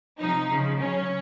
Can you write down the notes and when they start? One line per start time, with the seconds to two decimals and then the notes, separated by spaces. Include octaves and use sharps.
0.20 C3 F3 D#4
0.49 C#3 F3
0.79 C#3 F#3 C#4